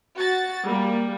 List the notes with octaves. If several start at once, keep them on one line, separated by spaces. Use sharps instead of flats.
F#4 A6
G3 A#3